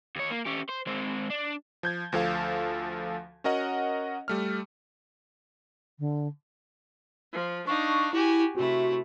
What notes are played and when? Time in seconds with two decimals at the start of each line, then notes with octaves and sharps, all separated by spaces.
0.16 D#2 C#5
0.31 A#3
0.46 C#4 G4
0.69 C5
0.87 G#3 C4
1.30 D4
1.83 F3 G6 G#6
2.12 D2 F3 A4 F5
3.44 C#4 F#4 A#4 D#5 F#5
4.28 G3 A3 F6
5.99 D3
7.33 F3
7.67 D4 D#4 F5 C#6
8.13 E4 F#4 G4 G#5
8.57 C3 A3 E4 F#4